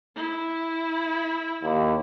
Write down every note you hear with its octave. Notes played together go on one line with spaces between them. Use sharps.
E4
D#2